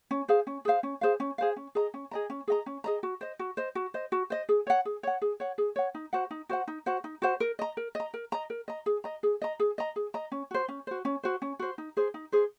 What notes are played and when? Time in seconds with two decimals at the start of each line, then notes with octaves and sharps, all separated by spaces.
0.11 C#4
0.28 G#4 C5 F5
0.47 C#4
0.65 G#4 C5 F5
0.83 C#4
1.01 G#4 C5 F5
1.20 C#4
1.38 G#4 C5 F5
1.56 C#4
1.75 G#4 D#5 A#5
1.94 C#4
2.11 G#4 D#5 A#5
2.30 C#4
2.48 G#4 D#5 A#5
2.66 C#4
2.84 G#4 D#5 A#5
3.03 F#4
3.21 C5 D#5
3.39 F#4
3.57 C5 D#5
3.75 F#4
3.94 C5 D#5
4.12 F#4
4.30 C5 D#5
4.49 G#4
4.67 C#5 F#5
4.85 G#4
5.03 C#5 F#5
5.22 G#4
5.40 C#5 F#5
5.58 G#4
5.76 C#5 F#5
5.95 D#4
6.13 F#4 C5 F#5
6.31 D#4
6.49 F#4 C5 F#5
6.68 D#4
6.86 F#4 C5 F#5
7.04 D#4
7.22 F#4 C5 F#5
7.40 A#4
7.59 D#5 A#5
7.77 A#4
7.95 D#5 A#5
8.14 A#4
8.32 D#5 A#5
8.50 A#4
8.68 D#5 A#5
8.86 G#4
9.04 D#5 A#5
9.23 G#4
9.42 D#5 A#5
9.60 G#4
9.78 D#5 A#5
9.96 G#4
10.14 D#5 A#5
10.32 C#4
10.51 F#4 C5
10.68 C#4
10.87 F#4 C5
11.05 C#4
11.23 F#4 C5
11.42 C#4
11.59 F#4 C5
11.78 D#4
11.97 G#4 C5
12.14 D#4
12.32 G#4 C5